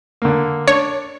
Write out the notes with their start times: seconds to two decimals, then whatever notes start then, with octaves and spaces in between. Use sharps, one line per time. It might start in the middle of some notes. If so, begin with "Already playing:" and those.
0.22 D3 A#3
0.68 D4 C#5